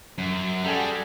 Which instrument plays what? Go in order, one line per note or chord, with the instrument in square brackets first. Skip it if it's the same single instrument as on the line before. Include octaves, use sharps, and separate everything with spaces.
[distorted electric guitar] F#2
[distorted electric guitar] G3 [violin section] F#4 G#4 A4